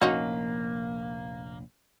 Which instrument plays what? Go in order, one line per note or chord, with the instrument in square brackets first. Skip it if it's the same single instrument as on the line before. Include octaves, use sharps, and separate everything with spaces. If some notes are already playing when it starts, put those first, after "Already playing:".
[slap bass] F1 A#1 [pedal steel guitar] A#3 [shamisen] C#4 D#4 F#4